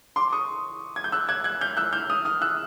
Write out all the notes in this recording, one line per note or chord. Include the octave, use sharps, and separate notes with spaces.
C6 D6
C#6 D#6
G#6
G6
E6 F#6
F#6 G#6
F#6 G#6
F6 G6
E6 F#6
F6 G6
D#6 F6
D#6 F6
E6 F#6